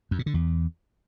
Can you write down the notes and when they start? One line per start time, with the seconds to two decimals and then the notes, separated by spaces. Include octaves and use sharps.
0.11 F2
0.19 A#2
0.26 D3
0.34 E2